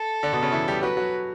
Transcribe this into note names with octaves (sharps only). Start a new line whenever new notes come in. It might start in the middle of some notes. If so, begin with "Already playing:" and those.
Already playing: A4
D3 D4
B2 B3
C#3 C#4
E3 E4
G3 G4
F#3 F#4 B4
F#3 F#4